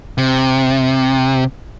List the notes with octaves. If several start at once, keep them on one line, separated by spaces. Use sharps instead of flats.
C3